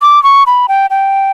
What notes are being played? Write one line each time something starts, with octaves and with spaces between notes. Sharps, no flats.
D6
C#6
B5
G5
G5